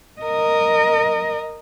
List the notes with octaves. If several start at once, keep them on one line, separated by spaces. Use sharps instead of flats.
A#4 D#5